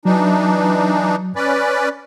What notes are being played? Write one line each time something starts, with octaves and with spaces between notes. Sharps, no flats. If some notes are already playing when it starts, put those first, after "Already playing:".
E3 F#3 D4 D#4
C#4 B4 D5